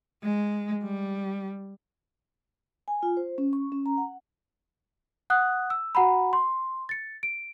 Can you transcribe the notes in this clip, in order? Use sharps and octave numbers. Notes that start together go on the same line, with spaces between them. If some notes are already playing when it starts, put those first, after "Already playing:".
G#3
G3
G#5
F4
C5
C#4
C#6
C#4
A#5
F#5
F#5 D#6 F#6
E6
F#4 F#5 A#5 B5
C6
A6 C#7
D7